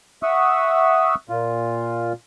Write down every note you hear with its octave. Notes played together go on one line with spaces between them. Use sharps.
E5 F#5 C#6 D#6 E6
A#2 F4